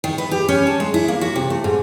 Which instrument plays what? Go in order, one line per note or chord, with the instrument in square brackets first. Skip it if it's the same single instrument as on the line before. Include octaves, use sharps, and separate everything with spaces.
[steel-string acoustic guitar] D#3
B4
G4
C#4
A5
G#3
E4
A#3
F#4
C3
A3
G#2